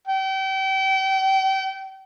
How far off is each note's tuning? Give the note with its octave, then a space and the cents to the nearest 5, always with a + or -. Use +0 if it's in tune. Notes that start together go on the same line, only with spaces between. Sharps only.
G5 -35